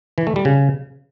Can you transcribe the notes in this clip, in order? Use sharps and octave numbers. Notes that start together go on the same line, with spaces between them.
E3
A3
G3
C#3